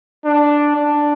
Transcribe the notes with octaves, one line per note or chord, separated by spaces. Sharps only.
D4
D4